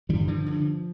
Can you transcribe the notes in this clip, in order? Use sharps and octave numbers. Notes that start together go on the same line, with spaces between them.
G2 D3 E3 G3
D3 F3
G2 D3